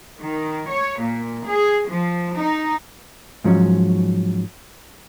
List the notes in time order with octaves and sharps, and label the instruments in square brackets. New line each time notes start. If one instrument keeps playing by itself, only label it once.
[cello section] D#3
C#5
A#2
G#4
F3
D#4
[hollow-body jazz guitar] G#2 F3 F#3 C#4